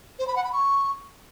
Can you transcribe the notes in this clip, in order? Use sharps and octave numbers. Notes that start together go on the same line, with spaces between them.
C5
B5
F#5
B5
C#6